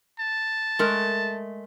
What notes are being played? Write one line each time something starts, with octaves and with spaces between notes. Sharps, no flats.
A5
G#3 A3 A#4